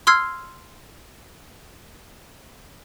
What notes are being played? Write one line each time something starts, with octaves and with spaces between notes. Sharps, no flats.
C6 E6 F6 G#6 C7